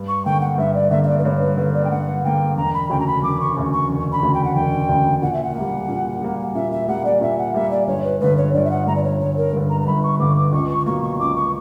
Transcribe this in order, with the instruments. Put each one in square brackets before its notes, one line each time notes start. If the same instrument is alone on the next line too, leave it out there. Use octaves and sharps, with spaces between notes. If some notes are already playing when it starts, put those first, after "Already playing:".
Already playing: [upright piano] G2
[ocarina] C#6
[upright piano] D3 A#3 [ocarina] G5
[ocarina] F#5
[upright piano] G2 [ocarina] E5
[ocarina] D5
[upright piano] D3 A#3 [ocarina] E5
[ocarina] E5
D5
B4
[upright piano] G2 [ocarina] C#5
[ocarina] B4
[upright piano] D3 A#3 [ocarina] B4
[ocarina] D5
G5
[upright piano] G2 [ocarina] F#5
[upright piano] D3 A#3 [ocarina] G5
[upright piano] E1 [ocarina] A#5
[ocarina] B5
[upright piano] D2 C#3 [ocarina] G5
[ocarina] A#5
B5
[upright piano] E1 [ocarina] D6
[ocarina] C#6
[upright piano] D2 C#3
[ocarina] C#6
[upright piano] E1
[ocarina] B5
[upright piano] D2 C#3
[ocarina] G5
F#5
[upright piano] E1 [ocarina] G5
[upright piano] D2 C#3
[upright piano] A#2 [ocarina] F#5
[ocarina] E5
F#5
[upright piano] A#3
G3
A#2
G3 A#3
[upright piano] A#2 [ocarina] E5
[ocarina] E5
[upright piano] G3 A#3 [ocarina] F#5
[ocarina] D5
[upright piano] A#2 [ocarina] E5
[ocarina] F#5
[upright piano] G3 A#3 [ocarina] E5
[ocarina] D5
[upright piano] G1 [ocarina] C#5
[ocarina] B4
[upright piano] G2 D3 [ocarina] B4
[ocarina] C#5
[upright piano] G1 [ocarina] D5
[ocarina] E5
F#5
[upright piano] G2 D3 [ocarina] A#5
[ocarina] D5
C#5
[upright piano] G1 [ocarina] C#5
[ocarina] A#4
[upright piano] G2 D3
[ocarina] A#5
A#5
[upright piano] G1 [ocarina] B5
[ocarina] C#6
[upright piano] G2 D3 [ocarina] D6
[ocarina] D6
[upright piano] C#2 [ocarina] C#6
[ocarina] C#6
[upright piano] B2 F#3 A#3 [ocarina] C#6
[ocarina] C#6
[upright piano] C#2 [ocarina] D6
[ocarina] C#6